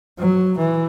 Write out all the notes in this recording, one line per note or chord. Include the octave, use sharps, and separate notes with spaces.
F#3
E3